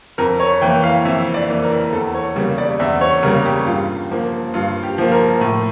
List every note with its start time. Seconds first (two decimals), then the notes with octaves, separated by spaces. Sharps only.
0.18 F2 A#4
0.40 C#5
0.61 E3 A#3 G5
0.84 F5
1.05 F2 E5
1.34 D5
1.49 E3 A#3
1.63 A#4
1.92 E2 A4
2.14 C#5
2.36 C#3 G3 A#3
2.58 D5
2.79 E2 E5
3.01 C#5
3.23 C#3 G3 A#3 A#4
3.45 G4
3.67 G2 F4
4.10 F3 A#3
4.54 G2 F4
4.83 G4
4.98 F3 A#3
5.12 A#4
5.41 A2